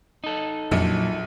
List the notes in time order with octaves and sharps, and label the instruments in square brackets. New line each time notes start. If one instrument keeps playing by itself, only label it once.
[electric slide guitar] D#4 A4
[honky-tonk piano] A#1 [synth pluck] F2 C#7 [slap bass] A#2 F#3